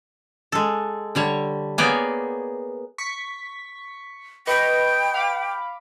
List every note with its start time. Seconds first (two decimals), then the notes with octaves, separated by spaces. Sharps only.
0.52 G#3 A4
1.15 D3 G3 C#5
1.78 A#3 B3 G#4 C#5 D5 G5
2.98 C#6 B6
4.47 B4 D#5 G5 C#6
5.14 F5 B5 D6